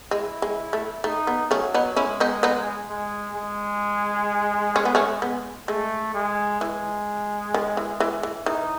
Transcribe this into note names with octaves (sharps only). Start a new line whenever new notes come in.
G#3 E4
G#3
A3
A3 D#4
B3
F#3 A3 C#4
B3 D#4
G#3 C#4 E4
B3 D#4
B3 D#4
G#3
G#3
C#4
B3
A3 C#4
B3
G#3 A3
G#3
E3 G#3
D#3
E3
E3
E3
E3 D#4